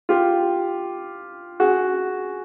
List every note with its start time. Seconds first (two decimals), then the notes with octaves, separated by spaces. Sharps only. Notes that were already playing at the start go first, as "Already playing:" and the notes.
0.09 F4 G4
1.60 F#4 G#4